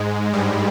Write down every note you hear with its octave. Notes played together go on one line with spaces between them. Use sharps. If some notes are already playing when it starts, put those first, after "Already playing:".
Already playing: G#2 G#3
G2 G3